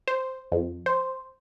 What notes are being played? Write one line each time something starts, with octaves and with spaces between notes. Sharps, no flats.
C5
F2
C5